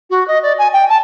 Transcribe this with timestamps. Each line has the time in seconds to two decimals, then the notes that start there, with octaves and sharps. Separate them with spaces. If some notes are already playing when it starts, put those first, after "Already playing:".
0.10 F#4
0.28 D#5
0.43 D5
0.59 G#5
0.73 G5
0.89 A5